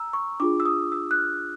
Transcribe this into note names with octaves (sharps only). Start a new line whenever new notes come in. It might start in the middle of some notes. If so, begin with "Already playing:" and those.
Already playing: A#5 E6
C#6
D4 F4 G#4 D6
E6
D#6
E6
F#6
F6